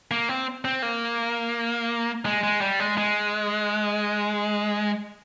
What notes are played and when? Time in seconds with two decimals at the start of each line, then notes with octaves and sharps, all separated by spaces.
0.11 A#3
0.29 C4
0.65 C4
0.82 A#3
2.25 G#3
2.43 G#3
2.61 G3
2.80 G#3
2.98 G#3